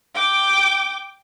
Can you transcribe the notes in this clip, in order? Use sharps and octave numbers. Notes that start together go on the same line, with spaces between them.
G5 D6